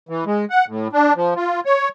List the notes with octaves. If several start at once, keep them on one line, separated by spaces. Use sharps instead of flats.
E3
G#3
F#5
A2
D4
F3
F4
C#5